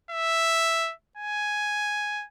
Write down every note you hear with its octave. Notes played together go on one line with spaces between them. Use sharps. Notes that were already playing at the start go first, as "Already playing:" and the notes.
E5
G#5